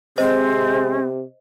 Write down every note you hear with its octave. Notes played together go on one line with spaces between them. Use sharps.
C3 G#3 C4 C5 D#5